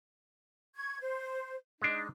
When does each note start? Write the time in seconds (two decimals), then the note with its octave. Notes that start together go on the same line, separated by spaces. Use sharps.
0.75 C#6 G#6
0.99 C5
1.82 G#3 D4 D#4